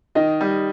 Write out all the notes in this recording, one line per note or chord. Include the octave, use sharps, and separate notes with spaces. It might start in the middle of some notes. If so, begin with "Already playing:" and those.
D#3 D#5
G3